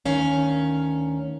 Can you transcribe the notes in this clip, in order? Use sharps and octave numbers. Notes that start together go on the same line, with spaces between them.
D2 D#3 C#4 F5